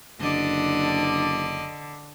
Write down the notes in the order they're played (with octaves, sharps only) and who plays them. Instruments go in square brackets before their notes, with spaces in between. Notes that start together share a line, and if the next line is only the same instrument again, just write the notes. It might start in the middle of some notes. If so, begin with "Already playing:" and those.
[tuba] F#1 [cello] D3 [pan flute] D4 [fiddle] D5 D#5